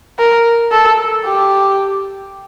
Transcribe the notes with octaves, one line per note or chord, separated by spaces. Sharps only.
A#4
A4
G4